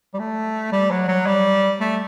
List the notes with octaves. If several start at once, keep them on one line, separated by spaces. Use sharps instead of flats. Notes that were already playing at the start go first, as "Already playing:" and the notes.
G3
A3
G3
F#3
F#3
G3
A3